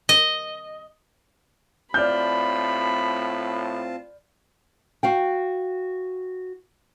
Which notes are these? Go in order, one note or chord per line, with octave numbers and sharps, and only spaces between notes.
D#5
A2 C4 F4 D5 A5 B5 F6 G6
F#4 F5 G5